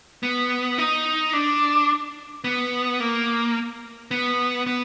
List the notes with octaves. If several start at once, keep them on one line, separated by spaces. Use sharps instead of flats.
B3
D#4
D4
B3
A#3
B3
B3